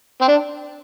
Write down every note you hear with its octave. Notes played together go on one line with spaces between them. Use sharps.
C4
D4